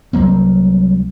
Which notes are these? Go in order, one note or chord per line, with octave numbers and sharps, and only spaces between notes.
C2 F#3 A#3 C4